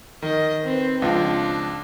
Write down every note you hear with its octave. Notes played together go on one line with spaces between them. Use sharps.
D#3 D#5
C4 B4
C#2 F3 D4